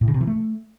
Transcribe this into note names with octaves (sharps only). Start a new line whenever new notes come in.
A2
C#3
C3
E3
A3